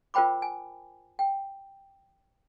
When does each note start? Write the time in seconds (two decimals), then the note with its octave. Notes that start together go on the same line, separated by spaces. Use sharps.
0.14 F4 A#4 C5 G5 B5 D6
0.42 G#5
1.19 G5